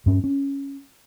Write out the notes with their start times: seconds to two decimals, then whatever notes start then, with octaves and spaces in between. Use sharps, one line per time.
0.06 G2 C#4
0.24 C#4